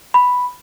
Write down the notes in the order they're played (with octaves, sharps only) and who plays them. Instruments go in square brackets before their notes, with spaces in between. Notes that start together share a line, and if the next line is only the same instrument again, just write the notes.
[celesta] B5